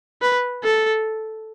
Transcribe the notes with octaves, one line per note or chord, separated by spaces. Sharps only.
B4
A4